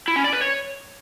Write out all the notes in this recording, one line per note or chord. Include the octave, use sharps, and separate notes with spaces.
E4
C#4
D5
B4
C#5